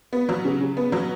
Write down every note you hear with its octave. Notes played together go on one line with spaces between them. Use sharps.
B3
F#3
C#3
C#3
B3
F#3